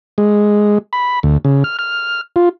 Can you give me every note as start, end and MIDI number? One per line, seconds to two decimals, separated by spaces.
0.18 0.78 56
0.93 1.19 83
1.23 1.37 38
1.45 1.64 49
1.64 1.77 89
1.79 2.21 89
2.36 2.49 65